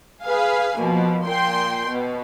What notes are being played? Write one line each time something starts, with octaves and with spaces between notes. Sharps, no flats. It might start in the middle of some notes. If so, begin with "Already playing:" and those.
G#4 B4 F5 G#5
B2 F3 A#3
A#2 G5 C6
B2